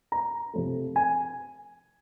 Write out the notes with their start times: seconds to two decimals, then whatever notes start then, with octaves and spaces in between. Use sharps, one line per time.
0.12 A#5
0.53 C3 F3 A3
0.96 G#5